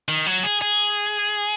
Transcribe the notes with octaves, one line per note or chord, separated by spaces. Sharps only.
D#3
F#3
G#4
G#4